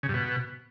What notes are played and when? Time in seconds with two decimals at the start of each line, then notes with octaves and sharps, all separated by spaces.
0.03 C#3
0.09 G2
0.14 B2